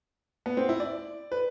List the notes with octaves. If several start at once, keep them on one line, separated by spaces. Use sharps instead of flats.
B3
C4
E4
D5
B4